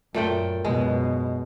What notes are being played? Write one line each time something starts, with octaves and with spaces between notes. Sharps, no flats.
F#2 A#2 A3 G5
F#2 B2 G#3